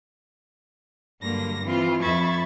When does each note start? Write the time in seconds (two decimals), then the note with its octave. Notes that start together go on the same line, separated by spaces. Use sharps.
1.21 G2 D3 F#3 A#3 A#6
1.63 E3 C4 F4
2.02 F2 E5 B5 C#6 G#6 A6